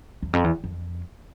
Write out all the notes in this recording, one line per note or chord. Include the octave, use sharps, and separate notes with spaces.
E2
F2
E2
F2